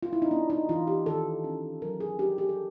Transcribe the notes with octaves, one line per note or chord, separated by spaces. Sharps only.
F4
E4
D#4
B3 D4
D#4
E3 F4
G4
D#3 A4
C#4
F#3 A#4
G#4
D4 G4
G4
A4